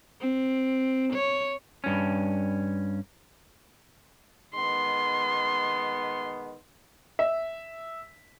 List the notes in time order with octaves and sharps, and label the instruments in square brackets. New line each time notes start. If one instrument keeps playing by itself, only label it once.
[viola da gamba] C4
C#5
[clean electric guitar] G2 C#4
[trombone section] D#3 G#3 B3 [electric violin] C6
[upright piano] E5